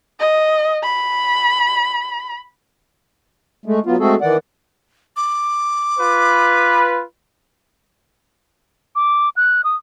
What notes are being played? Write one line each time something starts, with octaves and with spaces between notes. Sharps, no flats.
D#5
B5
G#3 A3
F#3 B3 F4
G#3 A3 C4 F#4 G#4 A4
D#3 E3 D5 F#5
D6
F4 B4
D6
F#6
D#6